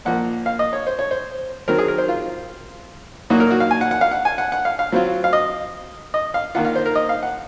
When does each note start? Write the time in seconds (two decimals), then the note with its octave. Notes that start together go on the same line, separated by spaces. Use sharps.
0.05 A#2 F3 A#3 F#5
0.46 F5
0.59 D#5
0.73 C#5
0.87 C5
0.99 C#5
1.11 C5
1.68 D#3 F#3 C4 A#4
1.79 G#4
1.88 A#4
1.98 C5
2.08 F4
3.30 A#2 F#3 A#3 D#4 F#4
3.40 A#4
3.51 F#4
3.60 F5
3.71 G#5
3.81 F#5
3.91 F#5
4.01 F5
4.11 F#5
4.25 G#5
4.38 F#5
4.52 F#5
4.65 F5
4.79 F5
4.92 F#3 C4 F4
5.24 F5
5.33 D#5
6.14 D#5
6.34 F5
6.55 D#3 A#3 F4 F#5
6.65 F5
6.75 C5
6.86 A#4
6.95 D#5
7.09 F5
7.23 F#5